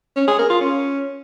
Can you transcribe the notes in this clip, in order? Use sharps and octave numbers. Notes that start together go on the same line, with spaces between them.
C#4
G#4
A#4
F4
C#4